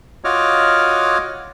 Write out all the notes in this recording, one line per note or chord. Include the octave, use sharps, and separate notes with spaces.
F4 F#4 C#5 D#5 D6 F6